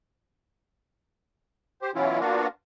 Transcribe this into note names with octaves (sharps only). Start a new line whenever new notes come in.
G4 C5
B2 E3 F#3 C#4 E4 F4
A#3 B3 D4 F4 F#4